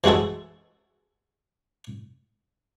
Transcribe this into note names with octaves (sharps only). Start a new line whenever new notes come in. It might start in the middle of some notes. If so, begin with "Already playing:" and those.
E3 G#3 F#4 G#4 A4